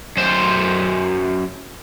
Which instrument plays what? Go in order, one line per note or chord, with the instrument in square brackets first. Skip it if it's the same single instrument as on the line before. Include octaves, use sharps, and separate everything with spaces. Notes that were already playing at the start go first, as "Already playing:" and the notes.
[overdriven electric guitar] F#2 C5